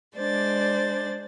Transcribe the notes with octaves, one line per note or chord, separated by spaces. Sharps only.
G#3 D4 C5 D5 A6